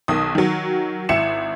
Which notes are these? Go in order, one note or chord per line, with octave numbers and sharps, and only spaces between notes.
B1 D#3 D#6
D#3 F#3
G#1 E4 C#7 E7